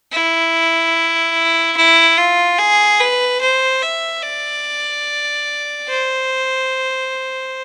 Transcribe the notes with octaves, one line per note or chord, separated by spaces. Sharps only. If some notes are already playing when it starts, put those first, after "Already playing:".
E4
E4
F4
G#4
B4
C5
E5
D5
C5